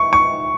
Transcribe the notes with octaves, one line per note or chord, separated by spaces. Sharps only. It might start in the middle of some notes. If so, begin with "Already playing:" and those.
Already playing: C#6
C#6